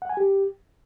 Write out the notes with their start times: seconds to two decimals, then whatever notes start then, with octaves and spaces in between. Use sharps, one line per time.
0.02 F#5
0.09 G#5
0.17 G4